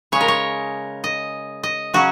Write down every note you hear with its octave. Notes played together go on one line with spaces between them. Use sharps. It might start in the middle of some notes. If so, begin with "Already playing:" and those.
C#3 G#3 C#4 C#5
A#4
C#5
D#5
D#5
C#3 F#3 C#4 F#4